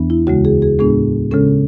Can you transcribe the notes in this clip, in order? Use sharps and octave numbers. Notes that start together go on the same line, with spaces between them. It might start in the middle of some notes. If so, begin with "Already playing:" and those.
Already playing: E2 E3 B3 D4
E4
D2 C#3 G#3 F#4
G#4
G#4
A2 G#3 B3 D4 G#4
C#3 G#3 C#4 A4